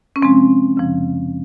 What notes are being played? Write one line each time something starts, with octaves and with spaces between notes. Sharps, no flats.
C#4
C3 F3 G#3 C4
F#2 C#3 F3